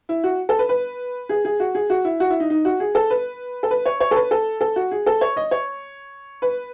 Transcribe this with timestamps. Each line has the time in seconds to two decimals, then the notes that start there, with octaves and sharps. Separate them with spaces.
0.09 E4
0.24 F#4
0.49 A4
0.59 B4
0.69 B4
1.29 G#4
1.45 G#4
1.60 F#4
1.75 G#4
1.90 F#4
2.05 E4
2.20 F#4
2.30 E4
2.40 D#4
2.50 D#4
2.65 F#4
2.80 G#4
2.95 A4
3.10 B4
3.63 A4
3.71 B4
3.86 C#5
4.00 C#5
4.11 A4
4.16 B4
4.31 A4
4.61 A4
4.76 F#4
4.91 G#4
5.06 A4
5.21 C#5
5.37 D#5
5.51 C#5
6.42 B4